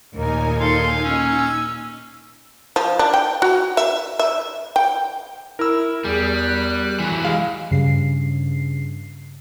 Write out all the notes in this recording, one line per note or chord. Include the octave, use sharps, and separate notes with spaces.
D#2 A#2 D#4 A#4 G#5
A4 F5 A5 C6
C#4 E6
F3
D4
G5
F#4
E5
E5
G5
E4 A#4 E6
E2 G3 G#4
F#6
E3 F#3
C3 G#3 F5
G2 C#3 C7